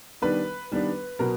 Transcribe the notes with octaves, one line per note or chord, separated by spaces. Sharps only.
D#3 G3 B3 D4 B4
D#3 G3 B3 D4
B2 F#3 B3 A#4